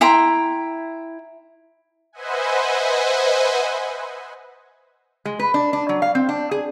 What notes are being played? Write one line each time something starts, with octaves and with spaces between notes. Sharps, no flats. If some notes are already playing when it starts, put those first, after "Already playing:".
E4 G5 A#5 C6
B4 C5 D#5 E5 F#5 G#5
G#3
B4
D4
D4
F#3
F5
C4
D4
G#4